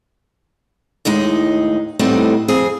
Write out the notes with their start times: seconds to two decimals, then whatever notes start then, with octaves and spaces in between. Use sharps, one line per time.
1.05 D#2 A2 G#3 D#4
1.99 A2 G3 A3 B3 C4 D#4
2.48 F2 C4 G#4